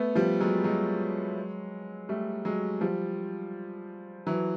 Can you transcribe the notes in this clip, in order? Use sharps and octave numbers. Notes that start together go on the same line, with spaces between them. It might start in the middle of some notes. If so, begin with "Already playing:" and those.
Already playing: A3 B3
F3 G3
F#3 G#3
F#3 G#3
G3 A3
F#3 G#3
F3 G3
E3 F#3